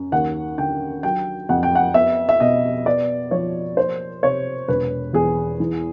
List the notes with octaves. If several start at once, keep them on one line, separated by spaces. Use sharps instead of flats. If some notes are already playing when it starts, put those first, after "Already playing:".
Already playing: F#2
D#2 F#5
D3 G5
F#3 G5
F2 F#5
G5
F#5
B3 E5
E5
B2 D#5
B3 D5
F3 C#5
A#3 C5
C3 C#5
E1 B4
E2 G#4
E3